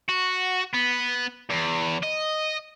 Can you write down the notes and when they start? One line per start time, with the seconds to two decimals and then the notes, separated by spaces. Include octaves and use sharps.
0.09 F#4
0.73 B3
1.50 E2
2.03 D#5